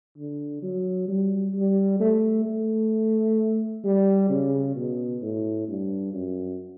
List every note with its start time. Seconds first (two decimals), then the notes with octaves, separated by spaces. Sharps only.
0.17 D3
0.62 F#3
1.08 G3
1.55 G3
2.00 A3
2.46 A3
3.84 G3
4.29 C#3
4.75 B2
5.22 A2
5.68 G2
6.14 F#2